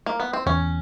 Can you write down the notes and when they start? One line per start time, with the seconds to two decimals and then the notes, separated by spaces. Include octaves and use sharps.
0.06 A#3
0.20 B3
0.33 C4
0.46 E2 C#4